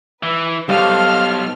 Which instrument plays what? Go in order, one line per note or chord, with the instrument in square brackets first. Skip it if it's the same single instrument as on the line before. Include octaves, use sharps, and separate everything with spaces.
[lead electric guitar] E3 [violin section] B4
[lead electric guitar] B1 [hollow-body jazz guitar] G3 [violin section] A4 C5 F6 [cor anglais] F5